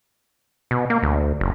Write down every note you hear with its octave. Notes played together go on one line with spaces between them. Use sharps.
B2
A#3
D2
F#1